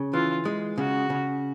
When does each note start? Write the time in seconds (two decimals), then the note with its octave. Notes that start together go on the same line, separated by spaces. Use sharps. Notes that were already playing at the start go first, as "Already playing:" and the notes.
Already playing: C#3
0.13 E3 F4
0.45 G#3
0.78 C#3 F#4
1.10 C#3